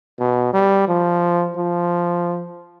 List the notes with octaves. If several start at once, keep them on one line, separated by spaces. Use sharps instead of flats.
B2
G3
F3
F3